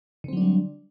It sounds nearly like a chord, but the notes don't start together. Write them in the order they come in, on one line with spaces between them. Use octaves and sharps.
D3 C4 F#3 D4 G3